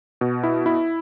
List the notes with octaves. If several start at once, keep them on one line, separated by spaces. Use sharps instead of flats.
B2
E4
E4